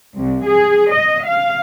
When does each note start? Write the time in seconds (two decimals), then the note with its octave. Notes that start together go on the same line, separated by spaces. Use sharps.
0.17 C2
0.46 G#4
0.93 D#5
1.26 F5